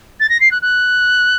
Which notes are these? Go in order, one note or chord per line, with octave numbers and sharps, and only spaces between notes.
A6
A#6
C7
F#6
F#6